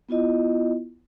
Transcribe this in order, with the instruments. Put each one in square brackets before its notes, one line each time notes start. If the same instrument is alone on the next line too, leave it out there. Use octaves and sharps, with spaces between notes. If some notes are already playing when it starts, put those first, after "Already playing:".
[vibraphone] B3 E4 F4 D#5